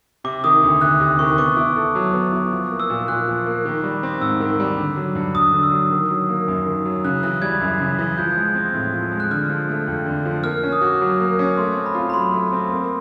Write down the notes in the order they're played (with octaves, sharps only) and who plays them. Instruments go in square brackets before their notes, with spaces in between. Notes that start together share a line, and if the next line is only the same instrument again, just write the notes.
[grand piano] C3 [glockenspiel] D6
[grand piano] D#3 [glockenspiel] D#6
[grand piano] D2
[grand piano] D2 [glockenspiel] F#6
[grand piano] C3 [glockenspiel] D6
[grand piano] D#3 [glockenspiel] C#6
[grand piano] B3 [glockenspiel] D6
[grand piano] E4
A4
F#3
B3
E4
F3
A#3
[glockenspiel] E6
[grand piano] A#2
[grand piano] A#2 [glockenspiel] F#6
[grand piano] F3
A#3
D#3
G3
C4
[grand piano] G#2 [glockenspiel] E6
[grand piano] D#3
G3
D3
F#3
G2
[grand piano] G2 [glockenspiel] D#6
[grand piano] D3
[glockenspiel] E6
[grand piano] F#3
D#3
F#3
A#3
F#2
D#3
F#3
[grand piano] C#3 [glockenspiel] F#6
[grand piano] E3 [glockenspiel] F#6
[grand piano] G3 [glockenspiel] G#6
[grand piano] F#2
C#3
E3
[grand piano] F3 [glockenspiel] G6
[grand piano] G#3
C4
A2
F3
G#3
[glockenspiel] F#6
[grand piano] D3 [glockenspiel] F6
[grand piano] F3
A3
F2
D3
F3
[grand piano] A#3 [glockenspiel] F6
[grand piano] C#4
[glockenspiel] D#6
[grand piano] F#4
[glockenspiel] D6
[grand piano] F#3
A#3
C#4
[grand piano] A3 [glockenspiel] C6
[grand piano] C4
[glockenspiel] B5
[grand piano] F4
[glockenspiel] B5
[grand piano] F#3 [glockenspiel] C6
[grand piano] A3
C4
A#3